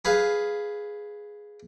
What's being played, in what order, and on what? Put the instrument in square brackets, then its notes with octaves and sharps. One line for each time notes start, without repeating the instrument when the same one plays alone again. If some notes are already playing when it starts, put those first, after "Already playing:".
[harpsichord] G#4 B4 F5